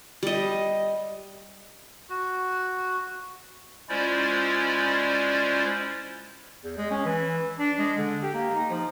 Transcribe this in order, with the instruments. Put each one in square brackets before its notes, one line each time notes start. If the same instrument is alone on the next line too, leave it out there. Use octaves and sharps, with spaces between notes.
[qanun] G3 D#5
[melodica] F#4
[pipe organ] G#3 C#4 E4 F4 C5 D5
[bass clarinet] E2
G#3
C#4
E3
D4
G#3
D3
G4
A#3
D#4
F3